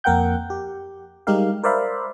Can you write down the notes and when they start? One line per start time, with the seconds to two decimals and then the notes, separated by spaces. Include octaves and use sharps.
0.04 F2 A#3 A#4 F#5 G5 G6
0.50 G4
1.27 G3 G#3 D#4 G4 A#4 F5
1.63 A#4 C5 D5 E5 F5 B5